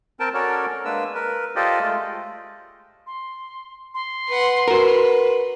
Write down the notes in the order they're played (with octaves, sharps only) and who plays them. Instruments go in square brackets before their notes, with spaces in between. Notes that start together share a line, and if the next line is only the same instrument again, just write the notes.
[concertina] C4 A#4 G5 A5
C#4 F#4 A4 A#4 C#5 D5
G#3 A#3 D4 B4 E6
A#4 B4
F4 G4 A4 C5 D5 D#5
G#3 A3 F4
[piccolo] C6
C6
[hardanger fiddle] B4 F#5
[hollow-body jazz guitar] F#4 A#4 [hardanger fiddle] B4